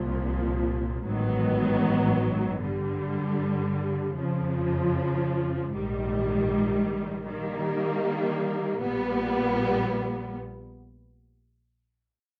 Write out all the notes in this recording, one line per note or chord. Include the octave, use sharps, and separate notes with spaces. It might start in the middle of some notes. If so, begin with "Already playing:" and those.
Already playing: C2 A#2 F3
A1 G#2 D#3 F#3 B3
G2 D3 G3
F2 C#3 F3
A#1 G#2 D#3 G3
D#3 G3 A#3
A#1 A#2 G3 B3